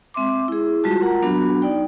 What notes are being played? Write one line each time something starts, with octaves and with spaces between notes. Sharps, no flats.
G#3 C4 E5 C6 D6
E4 G#4
G3 G#3 F4 F#4 A5
F4 A#4 F#5 A#5
F#3 B3 D4 F#4 B5
D#4 D5 G5